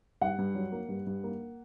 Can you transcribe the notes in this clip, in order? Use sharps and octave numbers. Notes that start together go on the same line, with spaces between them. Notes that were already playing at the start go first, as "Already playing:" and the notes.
G2 F#5
G2
F#3
A#3
G2
G2
A#3